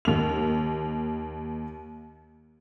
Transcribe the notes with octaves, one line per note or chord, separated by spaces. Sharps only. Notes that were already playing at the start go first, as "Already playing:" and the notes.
D#2 F7